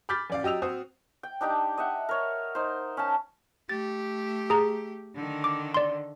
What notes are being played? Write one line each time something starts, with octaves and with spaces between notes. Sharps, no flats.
B5 D6 F6 G6 A6 B6
A1 D5 F5
F#3 G4 D#5 E6 F7
C4 F#4 C5 D#6
G5
D4 D#4 G4 G5
D#5 E5 F#5
A#4 C#5
D#4 C5
C#4 A5
A3 G4 A6
G#4 A#5
D3 D#3
D6
D5 C6